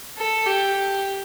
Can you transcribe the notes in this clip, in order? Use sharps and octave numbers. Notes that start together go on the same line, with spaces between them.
A4
G4